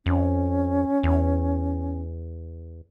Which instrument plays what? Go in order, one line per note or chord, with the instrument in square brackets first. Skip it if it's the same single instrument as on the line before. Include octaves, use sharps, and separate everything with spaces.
[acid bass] F2 [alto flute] C#4
[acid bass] E2